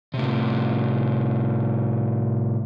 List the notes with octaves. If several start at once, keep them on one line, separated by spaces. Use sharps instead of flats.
A2 C3